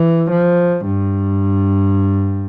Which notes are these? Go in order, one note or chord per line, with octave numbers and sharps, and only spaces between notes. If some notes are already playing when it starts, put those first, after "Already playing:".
Already playing: E3
F3
G2